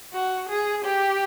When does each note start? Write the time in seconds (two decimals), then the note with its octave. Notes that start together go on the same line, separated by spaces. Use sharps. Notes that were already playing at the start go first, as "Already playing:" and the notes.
0.13 F#4
0.49 G#4
0.85 G4